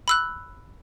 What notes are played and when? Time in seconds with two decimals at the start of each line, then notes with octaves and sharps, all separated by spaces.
0.08 B5 E6 F#6